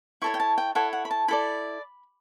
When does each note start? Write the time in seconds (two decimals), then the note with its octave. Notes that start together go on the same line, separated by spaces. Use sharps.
0.22 E4 A4 C#5 C#6
0.34 G5
0.40 A5
0.58 G5
0.75 E4 A4 C#5 F#5
0.93 F#5
1.05 B5
1.11 A5
1.28 E4 A4 D5 B5